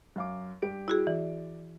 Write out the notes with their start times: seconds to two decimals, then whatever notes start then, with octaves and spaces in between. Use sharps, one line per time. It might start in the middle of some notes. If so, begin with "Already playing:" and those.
0.16 F#2 F5 D6
0.62 G2 G4 D7
0.88 E4 F#4 G#4
1.07 E3 D5